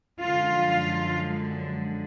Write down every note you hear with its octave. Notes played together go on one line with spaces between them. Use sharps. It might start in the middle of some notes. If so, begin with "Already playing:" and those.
F#2 D3 F3 G#3 F4 F5